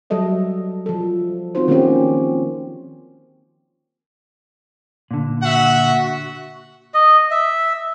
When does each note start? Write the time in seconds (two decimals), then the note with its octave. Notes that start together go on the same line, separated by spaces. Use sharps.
0.10 F#3 G3 A4 D#5 E5
0.86 F3 A4
1.55 C4 D#4 F4 F#4 C5
1.68 D#3 F3 A#3 C4 C#4 G4
5.11 A#2 D3
5.42 F#4 E5 F#5
6.94 D#5
7.31 E5